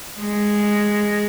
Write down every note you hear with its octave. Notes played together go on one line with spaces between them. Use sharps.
G#3